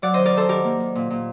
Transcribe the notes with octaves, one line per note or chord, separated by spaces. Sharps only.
F#3 D5 F#5
D#3 C5 D#5
A#4 D5
D#3 A4 C5
D#3 G4 A#4
A#3
D#3
A#2
A#2